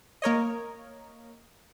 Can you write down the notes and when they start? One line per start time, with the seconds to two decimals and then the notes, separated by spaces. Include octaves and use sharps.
0.22 A#3 A#4 C#5 D#5